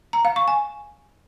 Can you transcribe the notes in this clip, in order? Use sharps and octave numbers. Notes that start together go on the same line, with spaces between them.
A#5
F5
C#6
G#5